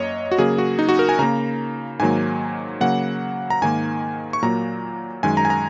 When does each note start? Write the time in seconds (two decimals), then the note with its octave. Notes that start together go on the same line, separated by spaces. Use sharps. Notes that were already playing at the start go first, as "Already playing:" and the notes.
Already playing: F#2 F#3 A#3 C#5 D#5
0.32 F#4
0.38 C#3 F#3 A#3 G#4
0.58 F#4
0.79 D#4
0.89 F#4
0.99 A#4
1.09 G#5
1.19 C#3 A#3 A#5
2.00 G#2 D#3 F#3 A#3 G#5
2.81 C#3 F#3 A#3 F#5
3.50 A#5
3.62 G#2 D#3 A#3 G#5
4.33 C#6
4.42 A#2 F#3 A#3 A#5
5.23 F#2 D#3 G#3 G#5
5.37 A#5
5.45 G#5
5.50 A#5